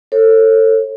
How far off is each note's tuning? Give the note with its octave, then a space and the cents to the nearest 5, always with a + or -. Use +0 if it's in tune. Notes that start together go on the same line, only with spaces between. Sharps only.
A4 +25 C#5 -35